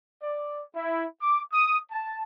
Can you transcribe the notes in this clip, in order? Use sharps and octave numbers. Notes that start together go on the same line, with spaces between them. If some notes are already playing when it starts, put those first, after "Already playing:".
D5
E4
D6
D#6
A5